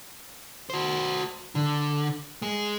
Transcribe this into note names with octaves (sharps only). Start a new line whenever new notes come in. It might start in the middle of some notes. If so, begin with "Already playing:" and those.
F#4 C5
D3
G#3